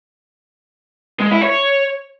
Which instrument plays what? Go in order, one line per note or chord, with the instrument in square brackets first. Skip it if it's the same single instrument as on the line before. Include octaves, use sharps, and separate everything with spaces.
[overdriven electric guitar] G#3
E4
C#5